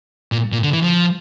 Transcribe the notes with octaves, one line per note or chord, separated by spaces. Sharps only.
A#2
A#2
D3
E3
F3